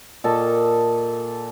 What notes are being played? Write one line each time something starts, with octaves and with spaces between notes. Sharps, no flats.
A#2 A4 D#5 A5